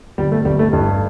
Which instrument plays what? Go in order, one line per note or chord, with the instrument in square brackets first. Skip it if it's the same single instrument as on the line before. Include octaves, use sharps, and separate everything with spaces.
[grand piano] G1 [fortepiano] G3
[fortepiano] A3
[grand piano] G1 [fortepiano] G3
[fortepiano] A3
[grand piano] G2